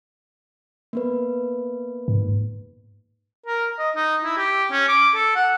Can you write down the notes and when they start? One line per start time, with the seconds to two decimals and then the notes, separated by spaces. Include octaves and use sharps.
0.93 A#3 B3 B4
2.08 G#2
3.46 A#4
3.78 D#5
3.96 D#4
4.24 E4
4.37 G4
4.71 C#4
4.88 D6
5.15 A4
5.36 F#5